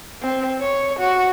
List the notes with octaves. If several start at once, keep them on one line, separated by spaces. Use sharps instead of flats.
C4
C#5
F#4